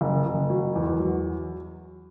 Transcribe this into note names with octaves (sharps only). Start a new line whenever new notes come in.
F#1
F#1
F#3
E2
F#3